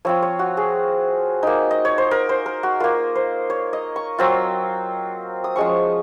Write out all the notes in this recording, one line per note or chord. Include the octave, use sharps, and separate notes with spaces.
F3 C4 F4 C#5
C#5
F#4
G#4
A#3 D#4
D#5
C#5
C5
A#4
C5
A#4
F#4
A#3 F4 A#4
C5
C#5
D#5
C#6
F#3 C4 F4
D#6
F3 G#3 C#4 C#6